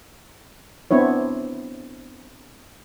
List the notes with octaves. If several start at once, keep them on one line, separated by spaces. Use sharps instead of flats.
B3 C4 D4 E4 C#5